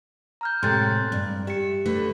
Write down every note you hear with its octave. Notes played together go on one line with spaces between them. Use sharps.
A#5 F6 G6
A2 C3 G#3 C6 F#6 A6
G2
G4 E5 C#7
D3 A3 B4